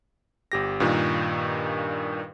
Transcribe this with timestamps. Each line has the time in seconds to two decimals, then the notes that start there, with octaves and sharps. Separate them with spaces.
0.52 G1 G4 A#6
0.80 G2 A#2 D#3